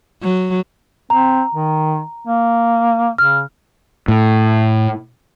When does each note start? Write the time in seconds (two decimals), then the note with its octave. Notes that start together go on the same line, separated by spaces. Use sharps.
0.22 F#3
1.10 C4 A#5
1.55 D#3
2.28 A#3
3.18 C#3 F6
4.08 A2